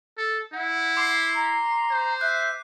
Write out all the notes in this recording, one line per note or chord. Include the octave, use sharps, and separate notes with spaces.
A4
E4 F#5
C6 D6 C7
A#5
C5
E5 F#6